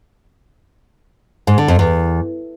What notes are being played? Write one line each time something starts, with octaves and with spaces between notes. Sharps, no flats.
G#2
D3
F2
E2